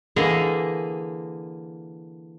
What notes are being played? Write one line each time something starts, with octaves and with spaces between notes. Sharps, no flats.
D3 E3 A#3 G#4 D#5 A#5